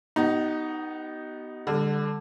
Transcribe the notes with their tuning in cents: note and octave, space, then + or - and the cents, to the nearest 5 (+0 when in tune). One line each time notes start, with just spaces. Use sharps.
B3 +0 D#4 +0 G4 -45
D3 +0 G3 +40